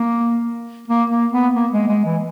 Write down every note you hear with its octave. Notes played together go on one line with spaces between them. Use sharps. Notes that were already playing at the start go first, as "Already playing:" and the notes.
Already playing: A#3
A#3
A#3
B3
A#3
G#3
G#3
E3